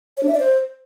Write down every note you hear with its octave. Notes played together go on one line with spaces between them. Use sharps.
C#5
D4
E5
D5
C5